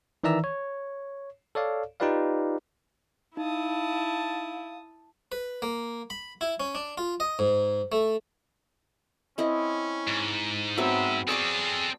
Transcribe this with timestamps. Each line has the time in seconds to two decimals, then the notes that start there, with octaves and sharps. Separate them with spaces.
0.24 D#3 E3 D5 E5 A#5 E6
0.44 C#5
1.55 A4 C#5 D5 F5
2.00 D#4 F4 G4 B4 D5 F5
3.37 D#4 E4 F5 A5 D#6
5.32 B4
5.62 A#3
6.10 B5
6.41 E4
6.60 C#4
6.75 D4
6.98 F4
7.20 D#5
7.39 G#2
7.92 A3
9.38 C4 C#4 E4 D#5
10.07 G#2
10.77 F#3 B3 C4 E5
11.28 C4 G#4 A4 D5 C#6 D6